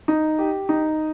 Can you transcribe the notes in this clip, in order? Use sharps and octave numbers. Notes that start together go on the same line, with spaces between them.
D#4
G4
D#4